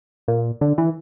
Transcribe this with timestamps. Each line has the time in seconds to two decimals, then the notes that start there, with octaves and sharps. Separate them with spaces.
0.28 A#2
0.61 D3
0.78 E3